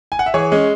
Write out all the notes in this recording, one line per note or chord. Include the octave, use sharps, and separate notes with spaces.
G#5
F#5
E5
E3 G#4 C#5
G#3 C#4